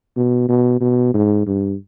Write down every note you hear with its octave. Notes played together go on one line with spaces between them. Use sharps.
B2
B2
B2
G#2
G2